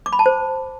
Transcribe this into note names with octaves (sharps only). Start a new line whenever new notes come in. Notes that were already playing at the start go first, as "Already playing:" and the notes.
D6
B5
A5
C5